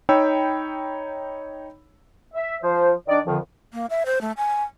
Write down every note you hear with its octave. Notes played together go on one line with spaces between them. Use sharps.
D#4 C#5 G5 B5 E6
E5
F3 C5
D#3 D4 D5
F2 D3 D#3 F3
A#3
E5
C5
A3
G#5